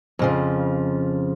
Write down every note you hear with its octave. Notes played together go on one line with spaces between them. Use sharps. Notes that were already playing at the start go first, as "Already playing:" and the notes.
F2 C#3 F3